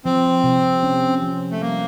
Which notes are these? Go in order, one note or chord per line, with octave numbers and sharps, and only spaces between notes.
F3 C4
C3
C#4
F3
A3
G3 A#3